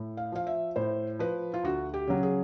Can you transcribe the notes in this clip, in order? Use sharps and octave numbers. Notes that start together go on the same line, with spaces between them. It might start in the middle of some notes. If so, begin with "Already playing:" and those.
Already playing: A2
F5
F3 F5
E5
A2 C5
F3 B4
F4
D2 F#4
G4
C#3 F#3
G#4